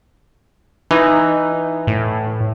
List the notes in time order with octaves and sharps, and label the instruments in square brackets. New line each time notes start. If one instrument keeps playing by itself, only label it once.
[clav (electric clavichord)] E3 [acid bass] D#4
[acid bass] A2